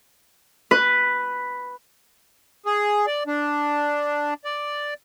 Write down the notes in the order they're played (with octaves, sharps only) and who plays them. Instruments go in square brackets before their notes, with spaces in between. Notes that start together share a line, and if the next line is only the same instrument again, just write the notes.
[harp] B4
[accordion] G#4
D5
D4
D5